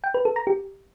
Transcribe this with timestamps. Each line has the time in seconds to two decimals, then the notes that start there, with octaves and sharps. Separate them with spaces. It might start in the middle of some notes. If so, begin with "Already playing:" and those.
0.04 G5
0.14 B4
0.25 A4
0.36 A#5
0.47 G4